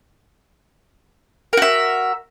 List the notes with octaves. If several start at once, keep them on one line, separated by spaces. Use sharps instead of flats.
F#4 A#4 E5